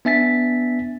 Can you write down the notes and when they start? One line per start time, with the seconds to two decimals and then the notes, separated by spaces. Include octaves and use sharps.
0.05 B3 D4 E5 G#5 A6 B6